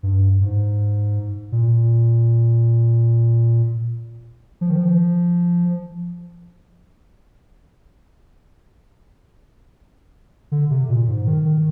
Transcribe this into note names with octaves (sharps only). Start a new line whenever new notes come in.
G2
G#2
A#2
F3
D#3
F3
D3
C3
A#2
G#2
D#3
D#3